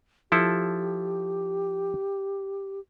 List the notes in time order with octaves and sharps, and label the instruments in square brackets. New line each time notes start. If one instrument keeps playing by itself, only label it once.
[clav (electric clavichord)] F3 E4 A4 [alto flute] G4